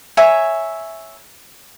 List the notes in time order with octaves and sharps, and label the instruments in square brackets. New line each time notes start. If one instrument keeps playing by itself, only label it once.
[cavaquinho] C#5 E5 G#5 A#5